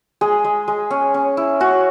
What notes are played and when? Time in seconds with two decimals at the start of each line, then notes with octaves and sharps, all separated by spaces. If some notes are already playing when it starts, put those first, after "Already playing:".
0.21 G#3 G#4
0.44 G#3
0.68 G#3
0.90 C#4
1.14 C#4
1.37 E4
1.60 C#4 F#4